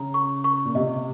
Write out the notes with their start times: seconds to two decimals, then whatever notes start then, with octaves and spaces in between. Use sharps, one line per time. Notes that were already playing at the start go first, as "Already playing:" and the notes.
Already playing: C#3 A#5
0.14 C#6
0.44 C#6
0.65 A#2
0.75 C3 D#5